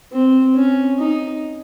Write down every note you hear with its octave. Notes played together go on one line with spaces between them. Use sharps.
C4
C#4
D#4